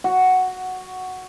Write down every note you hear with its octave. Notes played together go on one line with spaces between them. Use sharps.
F#4